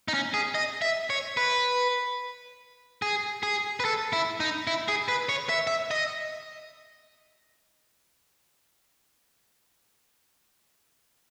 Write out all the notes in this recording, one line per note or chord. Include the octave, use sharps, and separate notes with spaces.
D#4
C#4
G#4
D#5
E5
C#5
B4
G#4
G#4
B4
A4
E4
D#4
E4
G#4
B4
C#5
E5
E5
D#5